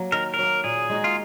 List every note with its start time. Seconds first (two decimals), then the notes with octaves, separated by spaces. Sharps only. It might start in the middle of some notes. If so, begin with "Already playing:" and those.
Already playing: F#3 A#3
0.12 D#3 A#4
0.34 A#4
0.39 F#3 A#3
0.64 A#2 G#4
0.90 G#3 D#4 F#4
1.04 F4